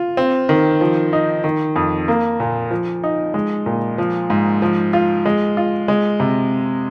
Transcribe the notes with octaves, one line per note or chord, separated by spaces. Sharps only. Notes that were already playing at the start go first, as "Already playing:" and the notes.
Already playing: F4
C4
D#3
F3
D#4
D#3
F2
A#3
A#2
F3
D#4
G#3
A#2
F3
G#2
F3
F4
G#3
F4
G#3
C3